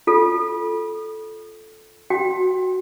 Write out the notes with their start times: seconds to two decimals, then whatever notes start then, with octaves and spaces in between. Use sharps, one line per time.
0.07 F4 A4
2.10 F#4 G5